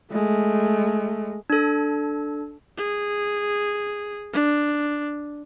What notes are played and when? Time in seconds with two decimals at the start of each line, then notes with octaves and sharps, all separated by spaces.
0.12 G#3 A3
1.50 D4 A4
2.78 G#4
4.33 D4